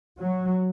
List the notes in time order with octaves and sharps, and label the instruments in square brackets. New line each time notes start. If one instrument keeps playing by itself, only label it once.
[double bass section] F#3